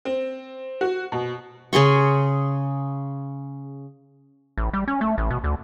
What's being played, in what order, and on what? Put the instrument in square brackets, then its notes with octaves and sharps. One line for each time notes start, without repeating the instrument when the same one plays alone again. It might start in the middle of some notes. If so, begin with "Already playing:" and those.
[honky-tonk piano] C4
F#4
B2
[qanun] C#3 G#4 C6 C#6
[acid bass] A1
G3
C#4
A3
A1
B2
D2